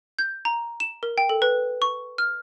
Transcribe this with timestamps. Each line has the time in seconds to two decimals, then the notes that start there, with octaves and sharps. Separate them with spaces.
0.19 G6
0.45 A#5
0.80 E7
1.03 A#4
1.18 G5
1.29 A4
1.42 B4
1.82 C#6
2.18 F6